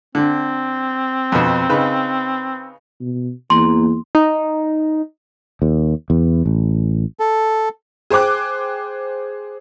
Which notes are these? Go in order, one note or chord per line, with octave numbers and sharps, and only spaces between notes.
D3 C4
F2 B2
C#3 D#4 B4
B2
E2 A#3 C6
D#4
D#2
E2
A1
A4
G#4 C5 G5 D6 F#6